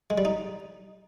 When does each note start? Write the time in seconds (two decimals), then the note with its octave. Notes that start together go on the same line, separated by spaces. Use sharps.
0.10 G#3
0.18 G3
0.25 D#4